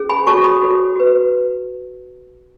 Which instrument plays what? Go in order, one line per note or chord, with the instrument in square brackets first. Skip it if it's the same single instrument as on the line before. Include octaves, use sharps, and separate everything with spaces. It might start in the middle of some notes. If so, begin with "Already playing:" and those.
Already playing: [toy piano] C#4 G#4
G#5 B5
F#4 A4 C#5 A5 C#6
B5 D#6
F#4 A4 C#5
F#4 B4